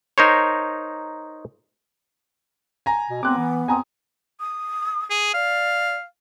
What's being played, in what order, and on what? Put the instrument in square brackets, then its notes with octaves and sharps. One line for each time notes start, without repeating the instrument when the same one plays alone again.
[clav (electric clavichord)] D#4 A#4 C5 C#5
[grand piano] G#5 A#5
[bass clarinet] B2
[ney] B3 [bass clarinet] C4 [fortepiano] D6 F#6
[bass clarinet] E3
[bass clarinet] C4 [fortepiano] G#5 A#5 D#6
[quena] D#6
[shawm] G#4
[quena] D5 [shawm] F5